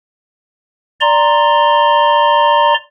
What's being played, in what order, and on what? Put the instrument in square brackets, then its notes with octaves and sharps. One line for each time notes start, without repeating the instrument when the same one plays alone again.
[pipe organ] D5 A#5 C6